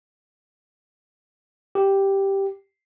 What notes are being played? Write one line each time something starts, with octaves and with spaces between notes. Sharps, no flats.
G4